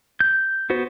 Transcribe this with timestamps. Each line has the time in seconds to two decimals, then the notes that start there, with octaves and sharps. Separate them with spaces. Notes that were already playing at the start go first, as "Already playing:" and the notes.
0.20 G6
0.70 B3 F#4 C5